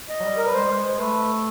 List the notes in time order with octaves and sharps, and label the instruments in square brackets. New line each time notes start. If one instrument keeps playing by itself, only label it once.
[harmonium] D#5
[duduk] F#3
G3
[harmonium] A#4
B4
[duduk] G#3 [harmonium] C5
[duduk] G3
G#3
[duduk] A3 [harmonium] B4